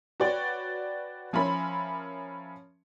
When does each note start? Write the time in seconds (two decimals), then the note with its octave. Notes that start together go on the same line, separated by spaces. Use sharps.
0.20 F#4 B4 C#5 D5 G5
1.33 F3 C#4 A#4 E5 B5 C6